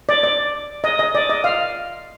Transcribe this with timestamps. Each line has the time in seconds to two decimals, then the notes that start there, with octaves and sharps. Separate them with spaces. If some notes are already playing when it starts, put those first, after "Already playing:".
0.09 D5
0.23 D5
0.84 D#5
0.99 D#5
1.15 D5
1.30 D#5
1.44 F5